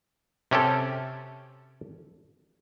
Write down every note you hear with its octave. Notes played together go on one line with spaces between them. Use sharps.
C3 C#4 G4 A4